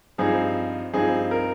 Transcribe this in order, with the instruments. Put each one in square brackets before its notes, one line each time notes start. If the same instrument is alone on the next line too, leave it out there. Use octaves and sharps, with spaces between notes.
[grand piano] G2 F3 C4 D#4 G#4
G2 F3 C4 D#4 G#4
A#4